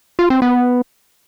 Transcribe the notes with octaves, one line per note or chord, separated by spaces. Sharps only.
F4
C4
B3